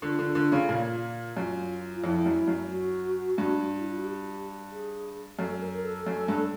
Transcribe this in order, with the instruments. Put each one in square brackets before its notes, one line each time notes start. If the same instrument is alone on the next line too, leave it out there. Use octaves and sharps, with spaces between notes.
[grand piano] D3 [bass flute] F4
[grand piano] D3
D3
C#3
A#2
[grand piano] F#2 [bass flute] F4
[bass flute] F4
[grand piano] F2 [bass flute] E4
[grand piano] F#2
F#2
[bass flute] F#4
[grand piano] G2
[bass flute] E4
F4
F#4
G4
G#4
[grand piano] F#2 [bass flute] A4
[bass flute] A#4
A4
[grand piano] F#2
G2